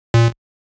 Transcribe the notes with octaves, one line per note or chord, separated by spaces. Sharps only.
A#2